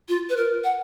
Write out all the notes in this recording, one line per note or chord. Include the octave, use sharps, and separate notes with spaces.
F4
B4
A#4
F#5